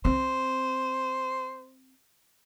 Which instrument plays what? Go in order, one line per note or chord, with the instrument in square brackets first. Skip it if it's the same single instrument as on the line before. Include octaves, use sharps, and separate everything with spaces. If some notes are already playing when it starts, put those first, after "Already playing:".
[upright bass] C4 [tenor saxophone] C5